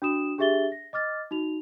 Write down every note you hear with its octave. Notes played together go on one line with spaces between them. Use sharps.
D4 F#4 D#6 E7
D4 G4 G#4 E5 A6 G7
A#6
D#5 D6 F6 A6
D#4 F#4 F7